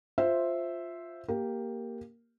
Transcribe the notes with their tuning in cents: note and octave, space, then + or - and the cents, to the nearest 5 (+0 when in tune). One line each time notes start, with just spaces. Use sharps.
F4 +5 C5 +0 E5 +0
A#3 +0 G4 +0 A#4 +0